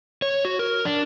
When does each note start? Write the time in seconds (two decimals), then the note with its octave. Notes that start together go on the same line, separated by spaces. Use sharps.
0.22 C#5
0.45 F#4
0.59 A#4
0.85 D4